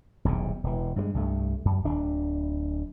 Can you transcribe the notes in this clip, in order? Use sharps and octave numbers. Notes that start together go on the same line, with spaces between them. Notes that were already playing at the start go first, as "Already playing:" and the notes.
D#1 B1 E2 C3
E1 E3
G2 F3 G#3
C2 G2 A3
F#2
D1 D4